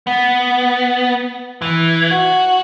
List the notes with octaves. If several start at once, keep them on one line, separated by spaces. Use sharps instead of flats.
B3
E3
F#4